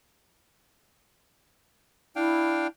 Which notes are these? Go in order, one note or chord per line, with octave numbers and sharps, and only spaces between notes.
D4 E4 F5 G5